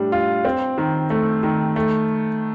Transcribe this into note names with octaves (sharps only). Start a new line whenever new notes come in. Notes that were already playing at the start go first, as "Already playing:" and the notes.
Already playing: A2 G3 D4
F4
C4
D#3
A3
D#3
A3